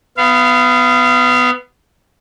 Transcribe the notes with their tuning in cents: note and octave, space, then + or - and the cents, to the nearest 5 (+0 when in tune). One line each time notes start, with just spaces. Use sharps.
B3 +15 F5 -30